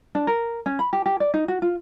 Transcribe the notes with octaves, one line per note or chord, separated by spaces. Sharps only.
D4
A#4
C#4
B5
G4
G4
D5
D#4
F#4
F4